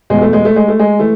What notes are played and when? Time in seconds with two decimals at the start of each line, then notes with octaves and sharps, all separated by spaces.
0.10 E2 B2 G#3
0.21 A3
0.33 G#3
0.45 A3
0.56 G#3
0.68 A3
0.79 G#3
0.99 E3 A3